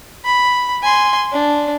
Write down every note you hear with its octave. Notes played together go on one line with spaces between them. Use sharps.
B5
G#5 C6
D4